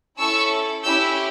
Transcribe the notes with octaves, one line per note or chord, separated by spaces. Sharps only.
C#4 E4 A4 C#6 E6
C#4 E4 G4 E6 G6